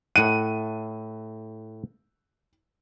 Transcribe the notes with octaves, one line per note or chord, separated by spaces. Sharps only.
A2 F#5 D#7